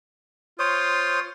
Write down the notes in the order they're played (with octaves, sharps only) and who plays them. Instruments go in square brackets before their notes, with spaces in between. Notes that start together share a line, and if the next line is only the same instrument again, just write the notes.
[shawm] F4 [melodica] C5 C#5 D#6